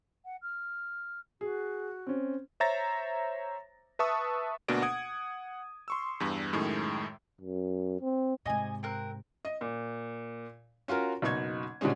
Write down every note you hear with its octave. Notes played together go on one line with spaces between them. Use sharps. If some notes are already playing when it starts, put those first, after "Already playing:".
F#5
F6
F#4 G#4
C4 C#4
C5 C#5 E5 A#5 A6 A#6
B4 E5 A5 C#6 D#6 E6
D2 B2 A#3 D4 F#4 D7
F#5 D#6 G#6
C6 C#6 E6
E2 G2
F#2 A2 D#3 G#3
F#2
C4
G#2 C3 D#5 G#5
C4 A#4 F#6
D#5
A#2
C#4 F4 F#4 A#4
F#1 B2 D#4 C#6 G#6
B2 D3 G3 G#3 C#4